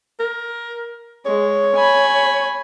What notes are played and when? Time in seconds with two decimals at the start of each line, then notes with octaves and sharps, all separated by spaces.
0.20 A#4
1.26 G#3 C#5
1.75 G#5 B5